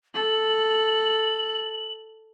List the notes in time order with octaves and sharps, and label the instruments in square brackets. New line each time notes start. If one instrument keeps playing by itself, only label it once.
[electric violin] A4 [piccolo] F#7